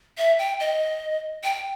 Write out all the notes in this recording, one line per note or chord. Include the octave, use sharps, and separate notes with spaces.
E5
G5
D#5
G5